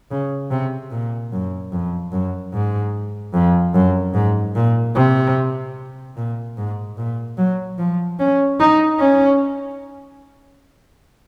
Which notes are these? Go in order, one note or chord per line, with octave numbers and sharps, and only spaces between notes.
C#3
C3
A#2
F#2
F2
F#2
G#2
F2
F#2
G#2
A#2
C3
A#2
G#2
A#2
F#3
F3
C#4
D#4
C#4